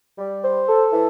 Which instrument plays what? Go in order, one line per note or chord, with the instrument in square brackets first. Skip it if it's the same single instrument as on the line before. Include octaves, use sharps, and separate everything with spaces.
[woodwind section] G3
C5
A4
E3